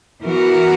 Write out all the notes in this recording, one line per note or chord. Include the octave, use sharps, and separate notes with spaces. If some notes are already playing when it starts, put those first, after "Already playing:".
E3 B3 F#4 A#4